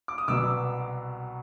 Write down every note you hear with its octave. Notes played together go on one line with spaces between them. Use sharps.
D6
D#6
C2 B2 F#3 B3 D6 E6